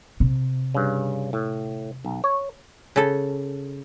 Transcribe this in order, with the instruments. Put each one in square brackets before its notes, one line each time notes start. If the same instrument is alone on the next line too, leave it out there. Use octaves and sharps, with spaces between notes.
[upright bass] C3
[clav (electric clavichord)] G2 C#3
A2
B1
C#5
[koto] C#3 A4